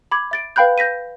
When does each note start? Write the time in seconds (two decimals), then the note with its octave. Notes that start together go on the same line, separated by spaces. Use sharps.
0.12 B5 D6 G#6
0.31 E5 A6 D7
0.56 B4 F5 G5 B5 F#6 G6
0.78 G6 A#6 B6 D#7